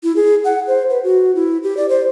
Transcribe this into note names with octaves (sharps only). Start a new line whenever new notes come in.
E4
G#4
F#5
C5
B4
F#4
E4
G4
D5
C5